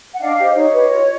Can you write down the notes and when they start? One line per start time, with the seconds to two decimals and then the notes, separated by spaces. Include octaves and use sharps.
0.14 F#5
0.20 D4 D#5 F5
0.37 G4 C5
0.55 D#4 C#5 D#5
0.73 G4 B4
0.91 F4